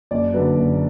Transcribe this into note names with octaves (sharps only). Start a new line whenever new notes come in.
F#1 D5
F#2 D3 F#3 B4
F#1